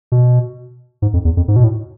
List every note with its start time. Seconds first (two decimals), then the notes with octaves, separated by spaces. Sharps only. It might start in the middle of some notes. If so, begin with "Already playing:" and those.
0.12 B2
1.02 G#2
1.14 F2
1.25 E2
1.37 F2
1.48 G#2
1.56 B2
1.64 A2